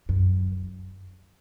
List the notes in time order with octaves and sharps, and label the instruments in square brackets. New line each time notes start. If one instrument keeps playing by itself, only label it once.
[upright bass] F#2